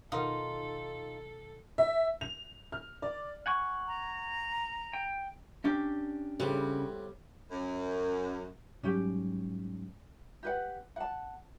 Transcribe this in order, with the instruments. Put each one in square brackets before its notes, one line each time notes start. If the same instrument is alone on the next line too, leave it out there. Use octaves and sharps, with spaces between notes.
[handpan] B2 D#3 [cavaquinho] D#4 F4 [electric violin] A4 [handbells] A#4 F#5 D#6
[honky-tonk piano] E5
F7
F6
D5
[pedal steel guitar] F#5 G#5 C#6
[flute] A#5
[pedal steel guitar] G5
[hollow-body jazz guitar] C#4 D4 G4
[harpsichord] A2 C4 F#5 [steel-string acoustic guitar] C#3 [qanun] G3 B3
[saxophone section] F#2
[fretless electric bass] G#2 F#3 G3 [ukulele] C#4 G4
[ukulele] G4 B4 F#5
F#5 A5